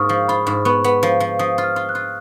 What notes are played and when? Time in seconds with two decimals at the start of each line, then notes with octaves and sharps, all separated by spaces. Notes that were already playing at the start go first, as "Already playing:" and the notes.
Already playing: G#2 A#3 F4 C#6 D#6 F6
0.09 F3
0.28 F4 B5
0.47 G#2
0.65 B3 C#6
0.84 B3
1.03 F3
1.20 F3
1.39 F3 D#6
1.58 F4
1.64 F6
1.76 F4
1.89 F#6
1.95 F4